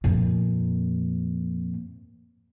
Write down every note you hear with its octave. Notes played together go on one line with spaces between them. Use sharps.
F2 A#2